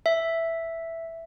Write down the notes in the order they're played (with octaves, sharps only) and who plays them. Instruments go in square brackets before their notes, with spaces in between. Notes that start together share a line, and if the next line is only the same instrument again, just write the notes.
[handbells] E5